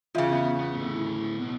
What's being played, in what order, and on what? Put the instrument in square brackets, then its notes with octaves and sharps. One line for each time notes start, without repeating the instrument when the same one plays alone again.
[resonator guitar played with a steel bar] E2 C#3 [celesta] F4 E5 F5
[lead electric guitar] B3
B3
A2 D3
[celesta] E4
[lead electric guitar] B1 B2